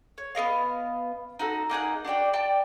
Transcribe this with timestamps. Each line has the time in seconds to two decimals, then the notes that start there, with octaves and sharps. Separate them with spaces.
0.18 C#5
0.35 B3 A#4 D#5 F5
1.39 D#4 F#4 A4
1.70 A#3 D#4 G#4 F#5
2.05 D4 F#4 D5 G5
2.33 D5 G5 A5